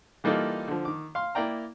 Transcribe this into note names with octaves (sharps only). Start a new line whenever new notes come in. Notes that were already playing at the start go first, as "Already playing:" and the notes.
E3 G3 A#3 D#4 F4 A4
D3 F3
D#3 D6
F5 C6
A#3 E4 D5 G5 A#5